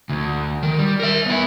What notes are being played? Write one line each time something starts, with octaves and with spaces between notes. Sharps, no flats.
D2
D#3
G3
A#4 E5
B3 E4